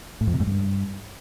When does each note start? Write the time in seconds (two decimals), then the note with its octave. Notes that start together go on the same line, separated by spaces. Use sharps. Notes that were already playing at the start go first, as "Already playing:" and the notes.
0.21 A2
0.27 F2
0.34 C3
0.40 G#2
0.47 G2